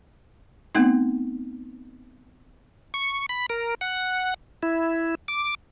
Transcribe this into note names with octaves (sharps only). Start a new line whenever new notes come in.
A3 B3 C4 D#4
C#6
B5
A#4
F#5
E4
D6